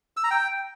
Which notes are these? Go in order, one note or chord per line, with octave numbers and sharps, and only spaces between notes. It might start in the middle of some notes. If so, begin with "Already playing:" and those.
E6
A#5
G5